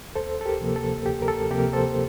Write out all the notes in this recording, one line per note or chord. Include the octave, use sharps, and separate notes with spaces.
D2 A4 C5
A4
G4 A#4
C3 F3 A#3
A4
D2 G4
A#4
A4
C3 F3 A#3 G4 A#4
A4 C5